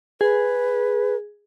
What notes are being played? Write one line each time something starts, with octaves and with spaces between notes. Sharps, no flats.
G#4 B4